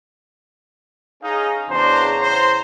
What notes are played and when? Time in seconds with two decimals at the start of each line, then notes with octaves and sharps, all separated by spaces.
1.23 C#4 D#4 G#4 F5
1.70 E2 C#3 D4 F#4 C5 A#5
2.22 C5